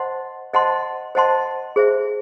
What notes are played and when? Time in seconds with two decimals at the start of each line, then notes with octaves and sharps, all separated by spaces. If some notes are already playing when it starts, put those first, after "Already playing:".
Already playing: C5 D#5 F#5 A5 C6
0.53 C5 D#5 F#5 A5 C6
1.15 C5 D#5 F#5 A5 C6
1.76 G#4 C5 E5